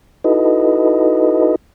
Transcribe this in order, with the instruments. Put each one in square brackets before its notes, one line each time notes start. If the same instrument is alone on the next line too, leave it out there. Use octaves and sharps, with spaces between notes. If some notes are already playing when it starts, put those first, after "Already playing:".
[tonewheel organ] D#4 E4 F#4 A4 B4 D#5